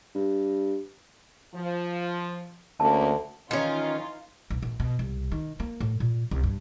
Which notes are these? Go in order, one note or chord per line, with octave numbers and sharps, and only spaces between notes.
G2
F3
D2 A#3 C#4 A5
D#3 E3 C#4 D#4 F4
B1
A#1
B2
C2
D#3
A#3
A2
A#2
C2
G2